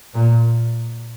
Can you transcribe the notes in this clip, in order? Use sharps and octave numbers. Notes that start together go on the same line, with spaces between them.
A#2